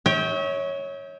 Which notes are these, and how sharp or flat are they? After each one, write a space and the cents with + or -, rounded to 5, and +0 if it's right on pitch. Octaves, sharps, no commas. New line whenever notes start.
C#5 +0 E5 -40 G5 +5